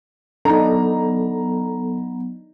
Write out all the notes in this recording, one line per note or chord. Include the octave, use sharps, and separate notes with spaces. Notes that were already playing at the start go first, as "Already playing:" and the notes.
F#3 B3 D4 D#4 A4 A#5